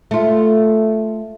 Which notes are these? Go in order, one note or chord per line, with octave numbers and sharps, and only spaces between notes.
A3 F4